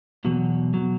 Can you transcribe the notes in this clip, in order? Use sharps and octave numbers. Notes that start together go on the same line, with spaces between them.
E2 B2 F#3
B2 F#3